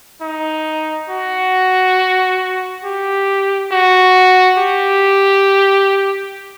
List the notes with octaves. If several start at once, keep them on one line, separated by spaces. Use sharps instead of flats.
D#4
F#4
G4
F#4
G4